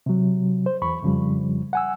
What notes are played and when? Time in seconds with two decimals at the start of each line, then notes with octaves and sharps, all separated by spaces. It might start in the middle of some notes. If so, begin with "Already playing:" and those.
0.06 C3 F#3
0.66 C5
0.82 E2 B5 C#6
1.03 F2 C#3 F3 G3
1.73 F#5 G#5 E6